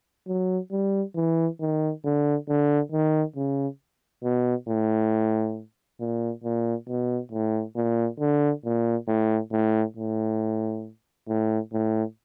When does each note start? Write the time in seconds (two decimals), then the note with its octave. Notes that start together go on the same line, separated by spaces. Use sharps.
0.27 F#3
0.72 G3
1.16 E3
1.61 D#3
2.04 D3
2.49 D3
2.92 D#3
3.36 C#3
4.24 B2
4.68 A2
6.00 A#2
6.44 A#2
6.89 B2
7.32 A2
7.76 A#2
8.20 D3
8.65 A#2
9.08 A2
9.52 A2
9.97 A2
11.28 A2
11.73 A2